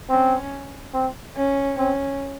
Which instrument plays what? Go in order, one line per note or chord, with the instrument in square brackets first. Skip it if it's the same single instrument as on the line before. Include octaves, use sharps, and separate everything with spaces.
[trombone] C4 [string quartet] C#4
[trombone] C4
[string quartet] C#4
[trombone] C4 [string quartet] C#4